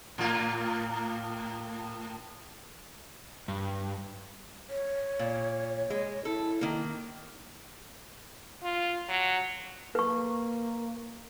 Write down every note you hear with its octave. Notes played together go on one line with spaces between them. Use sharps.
A2 A#3 F4
G2
C#5
A#2
G#3
E4 A4
D#3 A#3
F4
F#3
A#3 B4 C#6